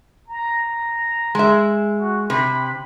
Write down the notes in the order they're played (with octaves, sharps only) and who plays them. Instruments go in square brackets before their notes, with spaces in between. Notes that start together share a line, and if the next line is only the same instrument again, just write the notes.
[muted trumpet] A#5
[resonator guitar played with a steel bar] G#3 E5
[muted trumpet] F#4
[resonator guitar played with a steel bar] C3 [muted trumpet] B5